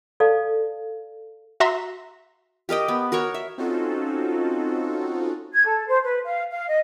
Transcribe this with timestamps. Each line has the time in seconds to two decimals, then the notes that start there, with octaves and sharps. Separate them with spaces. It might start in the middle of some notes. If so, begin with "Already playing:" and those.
0.20 A4 D5 F5 A5
1.60 F#4 E5 A#5 C6
2.69 G4 A#4 D#5 G5
2.88 B3
3.12 F#4 A#4 C#5 C#6
3.34 E5
3.58 C4 C#4 D#4 F4 F#4 A4
5.53 G#6
5.66 A4
5.87 C5
6.04 B4
6.25 F5
6.51 F5
6.68 D#5